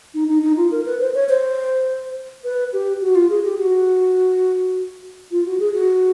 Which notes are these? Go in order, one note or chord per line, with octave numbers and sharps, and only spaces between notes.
D#4
D#4
D#4
F4
A#4
B4
C5
C#5
C5
B4
G4
F#4
F4
G#4
G4
F#4
F4
F#4
G#4
F#4